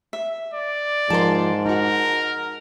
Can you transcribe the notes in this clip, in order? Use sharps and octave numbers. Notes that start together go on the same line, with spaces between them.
E5
D5
G#2 F3 A#4 A5 C6
D#4 F#4 A#4